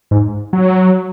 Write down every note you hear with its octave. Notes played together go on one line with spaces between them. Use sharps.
G#2
F#3